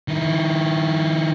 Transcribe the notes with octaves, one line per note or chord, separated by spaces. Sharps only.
D#3 E4